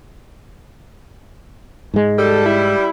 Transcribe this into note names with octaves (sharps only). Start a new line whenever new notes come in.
G#2 G#3
G3 A4
E4